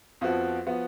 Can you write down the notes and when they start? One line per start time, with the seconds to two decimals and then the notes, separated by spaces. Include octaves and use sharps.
0.21 F2 F3 B3 F#4
0.66 F3 B3 F#4